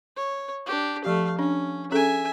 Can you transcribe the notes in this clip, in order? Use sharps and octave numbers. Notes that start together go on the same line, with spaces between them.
C#5
D4 G4
F3 A3 G4 F5
C#4 D4
C#4 G#4 A4 E5 G#5